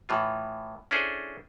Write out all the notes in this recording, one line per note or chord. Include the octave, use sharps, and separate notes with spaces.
A2 E3 F4
C#4 D4 E4 G#4 A4 C5